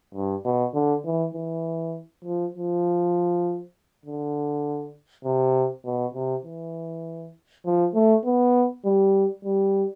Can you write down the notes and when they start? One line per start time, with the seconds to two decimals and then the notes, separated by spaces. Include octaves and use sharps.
0.15 G2
0.45 B2
0.74 D3
1.05 E3
1.35 E3
2.25 F3
2.55 F3
4.05 D3
5.25 C3
5.85 B2
6.15 C3
6.45 E3
7.66 F3
7.95 A3
8.25 B3
8.85 G3
9.45 G3